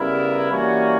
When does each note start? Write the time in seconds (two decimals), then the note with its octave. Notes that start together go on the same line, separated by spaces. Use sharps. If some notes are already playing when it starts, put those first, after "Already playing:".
Already playing: C#3 G3 B3 E4 A#4
0.51 E3 G3 A#3 C#4 F#4